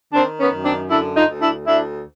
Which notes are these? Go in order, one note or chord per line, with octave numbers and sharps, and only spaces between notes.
D#3 C4 D4
B3 C#4
F#2
C4 D4
D3 D4 E4
D#4 F4
D2
D4 E4
D2 D4 E4